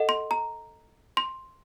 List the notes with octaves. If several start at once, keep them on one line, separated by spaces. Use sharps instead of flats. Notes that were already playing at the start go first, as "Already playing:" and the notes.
Already playing: A4 D#5 F#5
C6
A#5
C6